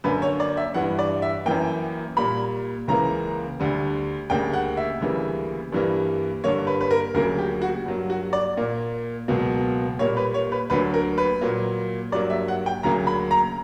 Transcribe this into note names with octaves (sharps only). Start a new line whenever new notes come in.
F#2 D3 A#3 B4
C#5
D5
E5
G2 E3 G3 F#5
D5
E5
F#2 E3 A#3 G5
A#2 G3 A#3 B5
C#2 C#3 E3 A#3 A#5
D2 D3 G3
D2 C#3 G3 A#3 G5
F#5
E5
D2 C#3 E3 G3 A#3
G2 E3 G3 A#3
G2 D3 A#3 C#5
B4
B4
A#4
D2 C#3 F#3 A#3 A#4
G4
F#4
G2 F#3 A#3
F#4
D5
A#2 A#3
C#2 B2 F#3 A#3
A#2 G3 A#3 C#5
B4
C#5
B4
D2 D3 F#3 A#3 B4
A#4
B4
A#2 F#3 A#3
G2 F#3 A#3 D5
E5
F#5
G5
D2 C#3 F#3 A#3 A#5
B5
A#5